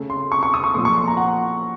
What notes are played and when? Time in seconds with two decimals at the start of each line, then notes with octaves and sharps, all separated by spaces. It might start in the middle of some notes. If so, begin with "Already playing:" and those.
Already playing: C#3 A3
0.10 C6
0.32 C#6
0.43 C#6
0.54 D#6
0.64 C#6
0.74 A#2 F3 A3 C6
0.85 C#6
0.96 C6
1.08 A#5
1.17 F#5